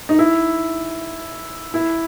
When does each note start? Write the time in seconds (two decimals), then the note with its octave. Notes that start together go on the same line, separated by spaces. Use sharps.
0.09 D#4
0.19 E4
1.74 E4